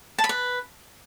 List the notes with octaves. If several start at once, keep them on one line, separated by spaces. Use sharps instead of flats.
A5
B5
B4